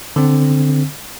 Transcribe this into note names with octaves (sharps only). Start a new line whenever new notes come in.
D3 C4